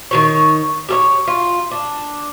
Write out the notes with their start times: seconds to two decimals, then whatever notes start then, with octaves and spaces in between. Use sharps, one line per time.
0.11 D#3 F3 C#5
0.89 G4 A4 C#5
1.28 F4
1.71 D4